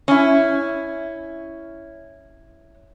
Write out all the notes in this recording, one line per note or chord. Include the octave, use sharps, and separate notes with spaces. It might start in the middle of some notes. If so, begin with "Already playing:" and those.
C#4 E4